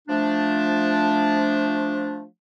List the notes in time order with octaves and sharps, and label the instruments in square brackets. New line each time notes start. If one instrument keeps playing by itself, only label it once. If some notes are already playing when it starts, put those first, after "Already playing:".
[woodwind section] F3 A3 D4